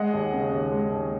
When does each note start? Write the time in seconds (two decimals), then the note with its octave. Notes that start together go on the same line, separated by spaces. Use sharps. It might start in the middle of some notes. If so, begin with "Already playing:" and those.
Already playing: G#3 D#5 F#5
0.13 D#2
0.33 C#3
0.52 D#2
0.72 G#3
0.92 D#2